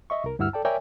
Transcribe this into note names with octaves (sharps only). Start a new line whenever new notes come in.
D#5 E5 C#6
C2 A#4
D2 G2 E4 F#5 E6 F6
A4 D5 G5 A5
A#4 C#5 D5 E5 G5 G#5